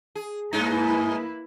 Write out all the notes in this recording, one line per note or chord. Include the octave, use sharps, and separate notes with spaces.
G#4
G2 G#3 A#3 D#4 E4 B4